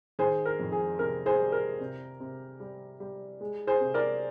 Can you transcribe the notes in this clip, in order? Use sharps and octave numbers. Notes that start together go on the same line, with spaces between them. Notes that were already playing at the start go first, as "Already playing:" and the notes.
D#3 G#4 C5
A#4
F2
G#4
C3 A#4
G#4 C5
G3
A#4
C3
C3
G3
G3
G#3
G#4 C5
C3
A#4 D5